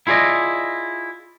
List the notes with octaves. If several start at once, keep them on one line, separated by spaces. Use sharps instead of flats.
E4 F4 G#4 D5 D#5